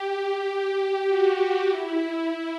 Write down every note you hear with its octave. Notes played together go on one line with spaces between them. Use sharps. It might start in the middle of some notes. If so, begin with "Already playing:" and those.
Already playing: G4
F#4
E4